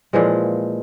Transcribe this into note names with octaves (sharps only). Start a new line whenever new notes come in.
A#2 E3 F3 G#3